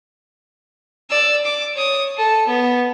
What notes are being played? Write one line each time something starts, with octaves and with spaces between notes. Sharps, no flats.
D5 E6
D6
C#5 D#6
A4
B3